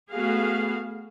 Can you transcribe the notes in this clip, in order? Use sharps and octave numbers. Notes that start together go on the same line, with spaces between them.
A3 B3 F#4 G#4 F5